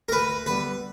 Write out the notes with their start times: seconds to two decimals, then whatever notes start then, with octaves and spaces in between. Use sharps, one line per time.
0.09 A#4
0.11 D2 B4
0.46 D3 G3 B3 B4